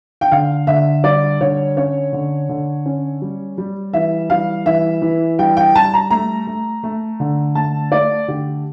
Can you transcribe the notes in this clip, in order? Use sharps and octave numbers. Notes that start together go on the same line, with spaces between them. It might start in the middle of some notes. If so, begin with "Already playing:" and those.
G5
D3 F5
D3 E5
G3 D5
D3 C#5
C#4 C#5
D3
D3
C#4
G3
G3
E3 E5
G3 F5
E3 E5
E3
G3 G5
G5
G3 A5
A#5
A3 A#5
A3
A3
D3
A3 A5
A3 D5
D3 G4